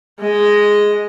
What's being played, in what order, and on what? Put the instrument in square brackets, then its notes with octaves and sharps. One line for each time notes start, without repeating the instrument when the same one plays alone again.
[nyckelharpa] G#3 D#5